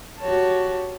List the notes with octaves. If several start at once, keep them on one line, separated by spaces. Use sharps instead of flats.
F#4 G4 C#5 A5